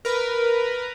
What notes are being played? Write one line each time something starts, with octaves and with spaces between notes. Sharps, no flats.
A#4 B4